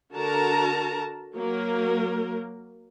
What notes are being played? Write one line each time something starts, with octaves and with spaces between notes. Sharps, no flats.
D3 F#4 A#4 A5 A#5
F#3 A#3 A#4